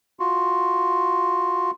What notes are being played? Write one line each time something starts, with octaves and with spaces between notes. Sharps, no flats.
F4 F#4